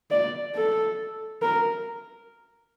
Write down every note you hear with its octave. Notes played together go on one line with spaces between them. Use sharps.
D5
A4
A#4